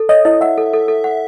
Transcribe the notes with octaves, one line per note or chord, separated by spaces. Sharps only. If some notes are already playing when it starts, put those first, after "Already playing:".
Already playing: A4
C#5 D#5
E4 D#5
E5 F#5
A4
A4
A4
F#5